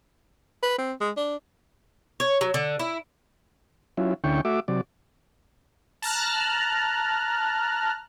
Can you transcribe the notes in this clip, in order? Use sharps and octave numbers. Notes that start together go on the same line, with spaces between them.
B4
C4
G#3
D4
C#5
F#3
D3
E4
F#3 C#4 E4 F4
D2 D3 C#4 E4 G5 C#6
A3 F#4 E5 D6
C3 F#3 D5
A5 A#5 F6 F#6